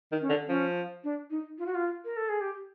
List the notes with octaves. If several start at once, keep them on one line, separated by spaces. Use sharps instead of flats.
D#3
C#4
D3
F3 C#4
D4
D#4
F4
F#4
F4
A#4
A4
G#4
G4